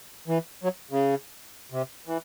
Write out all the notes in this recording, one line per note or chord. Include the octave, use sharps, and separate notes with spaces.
E3
F#3
C#3
C3
E3